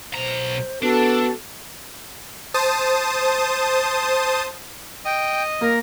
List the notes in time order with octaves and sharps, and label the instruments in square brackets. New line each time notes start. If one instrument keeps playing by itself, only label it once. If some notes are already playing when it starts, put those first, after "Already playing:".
[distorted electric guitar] B1 A#5 [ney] C5
[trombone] B3 [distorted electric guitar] D4 [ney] F#4 [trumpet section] A4
[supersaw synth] C5 A5 D#6
[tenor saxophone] D#5 [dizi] G5
[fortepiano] A#3 [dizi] A#4